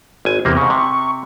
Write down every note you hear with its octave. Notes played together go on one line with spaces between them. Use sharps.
G#1 G#5
E2 C3 A#3 C4 G4
G#2 C#3 C#6
C3